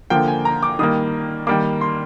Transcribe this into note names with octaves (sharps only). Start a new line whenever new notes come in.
D3 F3 A#3 G5
G#5
A#5
D6
D#3 G3 A#3 D#6
D#3 G3 A#3 D6
C6